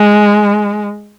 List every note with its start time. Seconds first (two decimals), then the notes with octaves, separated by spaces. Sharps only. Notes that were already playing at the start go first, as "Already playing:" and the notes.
Already playing: G#3